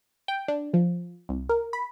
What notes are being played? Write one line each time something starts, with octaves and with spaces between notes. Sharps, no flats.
G5
D4
F3
C2
A#4
B5